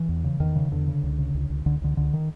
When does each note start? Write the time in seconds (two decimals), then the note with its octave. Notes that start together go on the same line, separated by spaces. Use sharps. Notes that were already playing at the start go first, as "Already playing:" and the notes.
Already playing: E3
0.09 E2
0.24 C#3
0.40 E2 D#3
0.56 C#3
0.71 E2 D3
0.88 C#3
1.03 C#2
1.19 C#3
1.34 C#2
1.50 C#2
1.66 C#2 D3
1.82 C#2 D3
1.97 C#2 D3
2.13 D#3